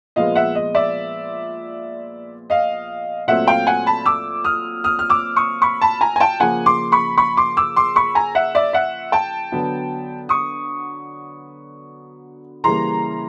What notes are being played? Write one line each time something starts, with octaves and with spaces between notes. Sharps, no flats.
A#2 F3 G#3 B3 D#5 F5
E5 F#5
D#5
D5 E5
D#5 F5
A#2 F#3 A3 C4 E5 F#5
F5 G5
F#5 G#5
A5 B5
D6 E6
D#6 F6
D#6 F6
F6
D6 E6
C#6 D#6
B5 C#6
A5 B5
G#5 A#5
G#5
G5 A5
C#3 F3 A#3 F#5 G#5
C6 D6
B5 C#6
B5 C#6
C6 D6
D6 E6
C6 D6
B5 C#6
G#5 A#5
E5 F#5
D5 E5
E5 F#5
G5 A5
D3 F#3 B3
C#6 D#6
C#3 E3 G3 A#3 A#5 C6